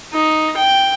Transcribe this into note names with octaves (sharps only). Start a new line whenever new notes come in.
D#4
G5